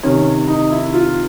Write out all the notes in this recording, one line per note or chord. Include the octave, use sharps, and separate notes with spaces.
C3 D#3 C#4
D#4
E4
F4